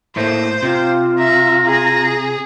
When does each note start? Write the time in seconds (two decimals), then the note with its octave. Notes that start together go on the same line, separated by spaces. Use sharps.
0.16 A2 A3 A#3 C5
0.63 C3 F4
1.18 E5 A#5
1.66 G#4